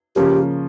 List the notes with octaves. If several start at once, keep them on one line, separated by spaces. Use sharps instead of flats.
C#3 F3 A#3 C#4 G4